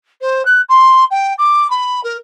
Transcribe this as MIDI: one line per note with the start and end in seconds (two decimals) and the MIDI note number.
0.21 0.45 72
0.45 0.61 90
0.69 1.04 84
1.10 1.33 79
1.38 1.70 86
1.70 2.01 83
2.03 2.17 70